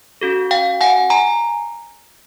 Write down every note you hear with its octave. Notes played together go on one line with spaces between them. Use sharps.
C#4 F#4 A4
F5 G5
F#5 G#5
G#5 A#5